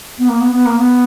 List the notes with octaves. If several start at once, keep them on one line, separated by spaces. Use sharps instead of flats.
B3
A#3
B3
B3
A#3
B3